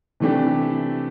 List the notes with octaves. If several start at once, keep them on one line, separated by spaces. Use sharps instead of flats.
C3 E3 A3 D4 G4